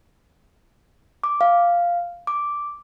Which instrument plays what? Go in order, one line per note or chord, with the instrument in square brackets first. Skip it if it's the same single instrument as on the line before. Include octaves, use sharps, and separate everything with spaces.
[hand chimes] D6
F5
D6